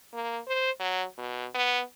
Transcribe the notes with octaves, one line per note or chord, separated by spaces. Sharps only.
A#3
C5
F#3
B2
B3